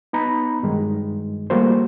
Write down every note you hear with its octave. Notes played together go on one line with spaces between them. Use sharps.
B3 D#4 A#5 B5
G2 D#3 G#3
F3 G3 A3 A#3 F#4 C5